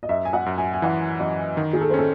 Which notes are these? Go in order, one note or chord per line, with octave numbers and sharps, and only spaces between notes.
D#5
F#2 E5
G#5
F#5
F#2
G#5
G#5
E3 F#5
F#2 D#5
D#3
G#4
A4
C5
C#4 A4